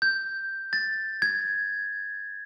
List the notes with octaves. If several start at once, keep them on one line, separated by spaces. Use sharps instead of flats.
G6
A6
G#6